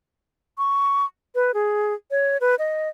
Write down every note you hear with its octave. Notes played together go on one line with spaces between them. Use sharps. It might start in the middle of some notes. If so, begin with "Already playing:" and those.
C#6
B4
G#4
C#5
B4
D#5